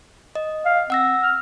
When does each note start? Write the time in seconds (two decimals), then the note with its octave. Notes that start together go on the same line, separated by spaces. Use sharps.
0.35 D#5
0.66 F5
0.90 C4 F#5 E6 A#6
1.22 F6